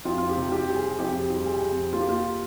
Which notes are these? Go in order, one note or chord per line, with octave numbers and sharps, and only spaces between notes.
F2 F4
F4
G4
C3
G4
G3
G#4
F2 G4
G3
G#4
F2
A#3 F4
G4
F4